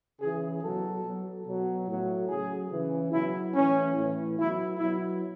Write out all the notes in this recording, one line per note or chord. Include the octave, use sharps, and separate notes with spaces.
C#3 E3 G#4
B2 F#3 A4
B2 F#3
B2 F#3
A2 F#3
C#3 F#3 G#4
C#3 E3
B2 F#3 E4
A2 E3 C#4
A2 E3
B2 F#3 E4
B2 F#3 E4